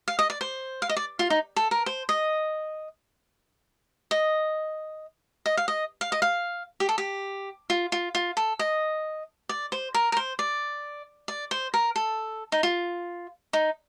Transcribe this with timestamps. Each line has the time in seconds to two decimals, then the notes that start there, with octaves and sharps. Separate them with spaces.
0.08 F5
0.19 D#5
0.30 D5
0.41 C5
0.82 F5
0.89 D#5
0.96 D5
1.19 F4
1.30 D#4
1.56 A4
1.71 A#4
1.86 C5
2.09 D#5
4.11 D#5
5.46 D#5
5.57 F5
5.68 D#5
6.01 F5
6.12 D#5
6.22 F5
6.80 G4
6.89 A4
6.98 G4
7.70 F4
7.92 F4
8.15 F4
8.37 A4
8.59 D#5
9.49 D5
9.72 C5
9.94 A#4
10.12 A#4
10.17 C5
10.39 D5
11.28 D5
11.51 C5
11.74 A#4
11.96 A4
12.52 D#4
12.63 F4
13.53 D#4